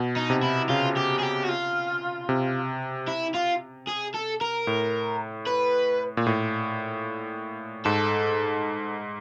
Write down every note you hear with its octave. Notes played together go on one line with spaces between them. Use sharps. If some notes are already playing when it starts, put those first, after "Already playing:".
Already playing: B2
D#4
C3
E4
C#3 F4
G4
G#4
G4
F#4
F4
C3
E4
F4
G#4
A4
A#4
A2
B4
A#2
A2
G#2 A4